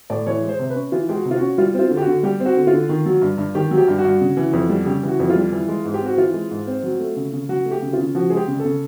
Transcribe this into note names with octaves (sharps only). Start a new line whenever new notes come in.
A2 D5
E3 C#5
G#3
C5
C3
B4
C#4
E3 F4
G#3 G4
F#4
C3
F4
F#4
C#4
G3 F4
C4 F4
D3
G4
F#4
D3
G3 G4
C4
F#4
D3
F4
D3
D#3
F#3
G2
G2
D#3 G4
F#3
G4
G2
F#4
G2
C#3
E3
F2
G3
C#3 G4
E3 F#4
F2
F4
G3
E3
G#3
G#2
G4
C4 F#4
E3 F4
G#3
G#2
C4
F#3
A3
C#3
C#3
F#3 F#4
A3
G4
C#3
F4
C#3
F3 F#4
G#3 G#4
G4
C#3
A4
C#3